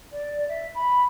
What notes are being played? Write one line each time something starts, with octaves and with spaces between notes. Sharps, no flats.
D5
E5
B5